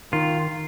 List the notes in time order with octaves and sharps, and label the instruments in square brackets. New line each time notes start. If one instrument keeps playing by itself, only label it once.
[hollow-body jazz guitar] D#3 [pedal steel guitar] F4